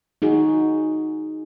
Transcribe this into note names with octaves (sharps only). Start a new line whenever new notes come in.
D#4 F#4 G#4